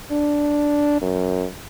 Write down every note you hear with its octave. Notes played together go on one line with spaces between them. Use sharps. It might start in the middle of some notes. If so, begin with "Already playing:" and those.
D4
F#2